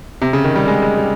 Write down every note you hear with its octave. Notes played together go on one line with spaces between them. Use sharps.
C3
C#3
D#3
G3
G#3
G#3
G3